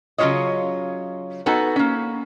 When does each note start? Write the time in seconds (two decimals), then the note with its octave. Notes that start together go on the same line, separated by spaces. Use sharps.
0.18 C#3 F#3 G#3 F4 C#5 D#5
1.46 B3 D#4 F#4 A4 G#5
1.76 A#3 C#4